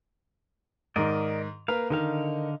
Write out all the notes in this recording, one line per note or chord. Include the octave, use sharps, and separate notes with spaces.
G#2 D#3 A#4 D5 D#5
A#3 A#4 B4 F5
D3 D#3 D#4 F5